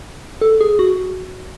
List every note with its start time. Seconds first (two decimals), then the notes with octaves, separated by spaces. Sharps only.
0.41 A4
0.61 G#4
0.79 F#4